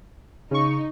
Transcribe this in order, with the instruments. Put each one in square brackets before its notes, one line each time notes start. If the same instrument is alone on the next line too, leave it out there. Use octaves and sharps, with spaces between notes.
[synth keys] C#3 C#6 [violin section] D#4